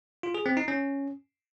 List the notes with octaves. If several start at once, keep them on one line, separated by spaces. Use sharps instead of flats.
F4
G#4
C4
D#4
C#4